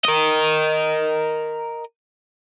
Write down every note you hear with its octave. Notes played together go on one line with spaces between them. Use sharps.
A#4 D#5